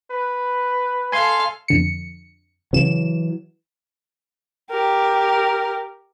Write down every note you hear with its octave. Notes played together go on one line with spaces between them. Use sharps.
B4
A4 F5 G#5 C6
F2 D3 C#7
C#3 E3 F#3 E7
G4 A#4